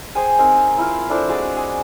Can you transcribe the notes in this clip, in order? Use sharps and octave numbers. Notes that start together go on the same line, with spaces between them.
G#4 C5 G5 G#5
C4 D#4 A#4 G#5
E4 F4 F5
D4 E4 A4 C5
G#3 F#4 G#4 D5
G#4